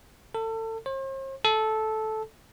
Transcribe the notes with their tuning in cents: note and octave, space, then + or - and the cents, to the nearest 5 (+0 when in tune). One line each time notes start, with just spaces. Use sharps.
A4 +30
C5 +45
A4 -10